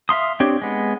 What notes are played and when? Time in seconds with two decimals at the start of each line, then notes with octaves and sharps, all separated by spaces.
0.09 E5 F5 C6 D#6
0.40 C4 D4 G4 C#5
0.62 G#3 B3